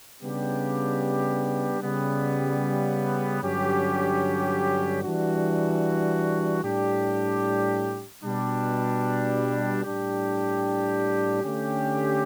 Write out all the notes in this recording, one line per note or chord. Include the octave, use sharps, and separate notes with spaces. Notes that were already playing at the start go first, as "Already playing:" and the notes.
C#3 G3 B3 D4 G4
C#3 G3 B3
G2 D3 F#3 C#4 G4
E3 G3 D4 F#4
A2 G3 D4 G4
B2 G3 D4
A2 G3 D4 G4
D3 A3 C#4 G4